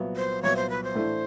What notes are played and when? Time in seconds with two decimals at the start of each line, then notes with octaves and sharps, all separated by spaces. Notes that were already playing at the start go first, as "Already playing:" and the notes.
Already playing: C2 A#2 F#3 B3
0.16 C5
0.43 C2 A#2 F#3 B3 C#5
0.56 C5
0.70 B4
0.84 C5
0.95 A2 E3 A3 D4